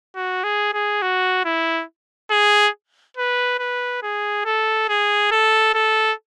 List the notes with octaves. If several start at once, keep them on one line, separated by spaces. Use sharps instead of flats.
F#4
G#4
G#4
F#4
E4
G#4
B4
B4
G#4
A4
G#4
A4
A4